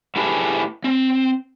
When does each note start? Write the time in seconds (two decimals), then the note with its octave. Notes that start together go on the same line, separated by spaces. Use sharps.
0.16 A2 E4 G4 G#4 B4 A5
0.84 C4